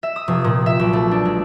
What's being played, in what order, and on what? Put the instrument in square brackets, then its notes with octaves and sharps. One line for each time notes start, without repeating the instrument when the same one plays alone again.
[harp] E5
D#6
F1
A#2
E5
B1
A3
D4
G#3